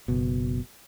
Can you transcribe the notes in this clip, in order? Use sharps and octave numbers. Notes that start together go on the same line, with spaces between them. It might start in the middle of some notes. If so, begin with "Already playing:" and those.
F#1 B2